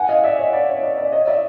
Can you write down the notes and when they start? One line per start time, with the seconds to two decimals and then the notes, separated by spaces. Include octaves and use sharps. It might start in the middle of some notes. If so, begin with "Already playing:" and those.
Already playing: F#5 G#5
0.09 D#5 F5
0.24 D5 E5
0.38 C#5 D#5
0.53 D5
0.69 C#5
0.83 D5
0.98 D5
1.12 C#5 D#5
1.27 D5 E5